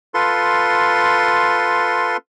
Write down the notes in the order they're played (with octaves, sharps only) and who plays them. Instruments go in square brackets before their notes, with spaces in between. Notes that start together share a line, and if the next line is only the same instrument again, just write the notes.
[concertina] F4 A4 B4 C6